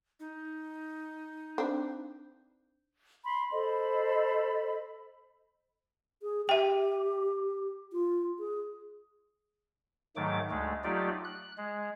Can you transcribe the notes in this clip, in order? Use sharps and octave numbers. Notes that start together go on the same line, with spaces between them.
D#4
C4 D4
B5 C6
A4 C5 D#5 B5
G#4
G4 E5 G5
F4
G#4
G#2 D#3 F#3 A3 D6
D2 G#3 A3
F#3 A3 D#4 F4 G4 D5
F#6
G#3